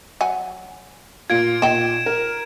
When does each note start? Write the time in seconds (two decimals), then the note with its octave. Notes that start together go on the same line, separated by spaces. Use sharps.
0.21 F#3 F#5 G#5
1.30 A#2 F4 G#6 D7
1.62 A#2 D#4 G5 E7
2.06 A#4